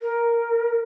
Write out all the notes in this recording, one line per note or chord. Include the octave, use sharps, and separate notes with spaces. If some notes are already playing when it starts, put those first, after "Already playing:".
A#4